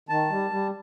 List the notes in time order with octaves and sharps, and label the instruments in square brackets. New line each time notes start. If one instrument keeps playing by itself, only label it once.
[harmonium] D#3 A5
G3
G3